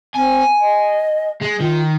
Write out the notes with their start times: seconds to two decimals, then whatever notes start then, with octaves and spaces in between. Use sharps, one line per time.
0.16 C4 G#5
0.61 D#5
1.42 G#3
1.61 D#3 F4